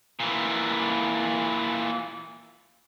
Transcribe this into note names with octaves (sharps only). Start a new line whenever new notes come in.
A#2 E3